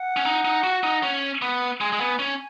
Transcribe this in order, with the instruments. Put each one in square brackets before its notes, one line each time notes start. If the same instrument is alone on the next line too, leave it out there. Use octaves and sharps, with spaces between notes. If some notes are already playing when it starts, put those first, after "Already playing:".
Already playing: [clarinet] F#5
[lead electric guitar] C#4
D#4
D#4
F#4
D#4
C#4
B3
[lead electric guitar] G#3 [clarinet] G#5
[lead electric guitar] G#3
B3
C#4